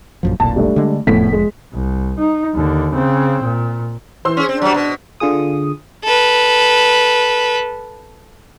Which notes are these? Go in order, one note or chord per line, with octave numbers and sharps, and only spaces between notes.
A#1 F#2 F3
F1 B1 A#2 A5
G3 A3 D4
D3 G#3
F1 E2 A2 F3 B6
G#3
C2
D#4
D#2 D3
C#3 C4
A#2
E3 C5 C6 E6
C#4 G#4
C4 D4
F#3 G3
B2
D3 F4 G#4 D#6
A4 B4